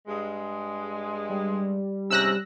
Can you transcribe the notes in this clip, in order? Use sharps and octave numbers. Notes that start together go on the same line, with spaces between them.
G2 G#3
G3
G#2 C3 C#4 E6 F#6 A#6